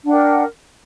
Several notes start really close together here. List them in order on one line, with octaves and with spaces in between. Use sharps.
D4 F#5 G5 A#4